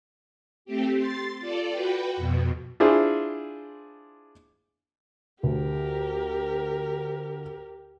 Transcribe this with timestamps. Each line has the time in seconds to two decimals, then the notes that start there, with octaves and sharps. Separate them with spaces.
0.65 A3 C4 G4
0.97 C6 A6
1.39 F4 A4 D5
1.71 F#4 B4 G5
2.16 F2 B2
2.80 D4 E4 F4 G#4 C5
5.43 D2 G4 A#4